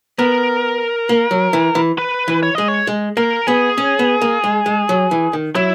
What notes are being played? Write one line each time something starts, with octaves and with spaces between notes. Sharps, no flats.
B3 A#4
A#3
F#3
E3
E3
B4
E3
C#5
G#3 D#5
C#5
G#3
A#3 A#4
B3 G#4
C#4
B3
A#3
G#3
G#3
F#3
E3
D#3
F#3 E4